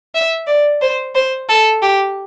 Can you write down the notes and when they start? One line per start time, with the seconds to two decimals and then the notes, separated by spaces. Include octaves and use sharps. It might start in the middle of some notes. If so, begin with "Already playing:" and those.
0.15 E5
0.47 D5
0.81 C5
1.15 C5
1.49 A4
1.82 G4